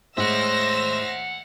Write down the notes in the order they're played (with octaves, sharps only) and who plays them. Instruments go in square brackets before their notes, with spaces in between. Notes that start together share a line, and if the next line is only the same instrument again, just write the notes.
[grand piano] A2 G#3 [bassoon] C5 [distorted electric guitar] E5 F#5 [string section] E6 A#6